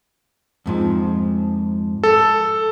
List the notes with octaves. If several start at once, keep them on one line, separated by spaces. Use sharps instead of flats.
F2 G#2 F3
A4